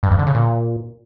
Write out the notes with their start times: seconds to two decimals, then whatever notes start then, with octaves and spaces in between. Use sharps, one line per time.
0.03 G2
0.11 F2
0.19 D3
0.27 C#3
0.35 A#2